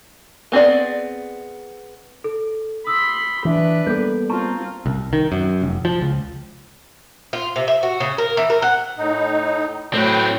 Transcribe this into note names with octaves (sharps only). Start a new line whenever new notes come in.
B3 C4 G#4 D5
A4
B5 C6 D#6 E6
E3 D4 B4
G3 A#3 B3 A4 G6
C4 F4 A5 A#5 C#6
C2
D#3
F#2
F1
F3
C#2
F4
C3
E5
F#4
C#3
A#4
E3
A#4
F#5
A2 D#4
A2 F#3 C4 B4 G5